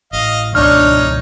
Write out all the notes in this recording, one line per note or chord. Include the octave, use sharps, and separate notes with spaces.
A1 D#5 F5
C#2 G#2 B2 D4 D#4 C#5 F6